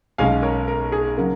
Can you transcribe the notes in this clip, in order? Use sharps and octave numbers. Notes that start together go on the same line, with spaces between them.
B1 B2 G#3 C#4 F5 G#5
A#4 C#5
A#4
G#4
C#3 F#3 A#3 A#4